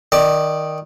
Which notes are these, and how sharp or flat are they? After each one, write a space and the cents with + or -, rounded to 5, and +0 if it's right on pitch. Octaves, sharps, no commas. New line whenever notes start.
D#3 +0 D5 +10